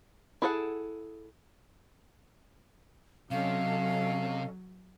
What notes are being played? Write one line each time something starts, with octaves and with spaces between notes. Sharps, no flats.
E4 G#4 A4 C5 F#5
C3 F#3 C#4 A4 D#5 F5